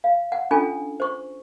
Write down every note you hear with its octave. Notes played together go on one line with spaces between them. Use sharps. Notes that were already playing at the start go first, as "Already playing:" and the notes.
F5
F#5
C#4 D4 F4 A4 G#5
C5 C#6